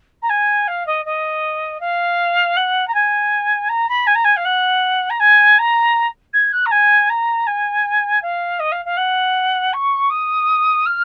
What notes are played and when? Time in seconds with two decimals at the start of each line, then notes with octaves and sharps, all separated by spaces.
0.22 A#5
0.29 G#5
0.67 F5
0.86 D#5
1.05 D#5
1.80 F5
2.56 F#5
2.87 A#5
2.94 G#5
3.69 A#5
3.89 B5
4.06 G#5
4.15 A#5
4.24 G#5
4.36 F5
4.45 F#5
5.10 A#5
5.20 G#5
5.58 A#5
6.33 G#6
6.52 F#6
6.66 A#5
6.71 G#5
7.09 A#5
7.47 G#5
8.22 F5
8.59 D#5
8.72 F5
8.85 F5
8.97 F#5
9.73 C#6
10.10 D#6
10.86 F6